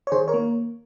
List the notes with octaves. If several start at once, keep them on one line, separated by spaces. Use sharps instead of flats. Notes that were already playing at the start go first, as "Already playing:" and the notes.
C#5
D#3 G#4 C5
A#4 C#5
A#3